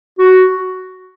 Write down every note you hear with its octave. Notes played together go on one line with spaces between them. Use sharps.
F#4